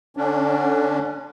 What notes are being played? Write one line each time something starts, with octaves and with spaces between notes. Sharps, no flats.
D3 C#4 D4